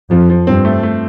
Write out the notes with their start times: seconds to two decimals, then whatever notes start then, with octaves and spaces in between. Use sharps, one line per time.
0.11 F2 F3
0.29 F3
0.47 G2 C4
0.65 A3
0.83 A3